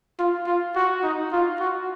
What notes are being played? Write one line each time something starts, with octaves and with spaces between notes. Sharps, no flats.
F4
F4
F#4
D#4
F4
F#4